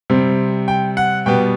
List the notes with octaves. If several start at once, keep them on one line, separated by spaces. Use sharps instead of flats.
C3 G3 C4
G5
F#5
B2 G3 B3 G5